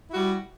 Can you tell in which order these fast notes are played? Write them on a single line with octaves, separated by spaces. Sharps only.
E4 F#4 G3